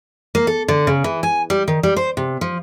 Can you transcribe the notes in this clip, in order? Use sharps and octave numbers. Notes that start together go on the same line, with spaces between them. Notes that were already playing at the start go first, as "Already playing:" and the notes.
A#3
A4
D3
C#3
E3
G#5
G3
D#3
G3
C5
C3
F3